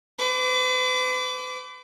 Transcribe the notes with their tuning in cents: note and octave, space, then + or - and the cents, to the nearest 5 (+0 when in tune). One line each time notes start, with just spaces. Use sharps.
B4 +45 D6 -20